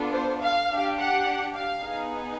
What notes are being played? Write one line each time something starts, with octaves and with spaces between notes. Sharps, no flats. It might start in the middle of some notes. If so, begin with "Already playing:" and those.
Already playing: B3 D4 F4 A4
C5
F5
D4 G4
F#5
F5
B3 D#4 G#4